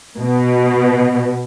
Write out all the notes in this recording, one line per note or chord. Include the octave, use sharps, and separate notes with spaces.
B2